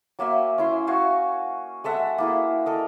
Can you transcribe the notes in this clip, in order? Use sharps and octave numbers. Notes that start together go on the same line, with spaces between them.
F#3 A#3 E5 G#5
C#4 E4 C6
F#4 F5 G#5 C#6
G#3 A4 E5 F#5
A#3 E4 G#4
A4 A#4 D#5